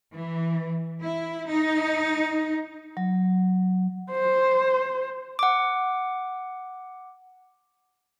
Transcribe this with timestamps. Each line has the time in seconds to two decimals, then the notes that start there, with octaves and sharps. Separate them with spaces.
0.14 E3
1.01 E4
1.47 D#4
2.97 F#3
4.11 C5
5.39 F#5 D6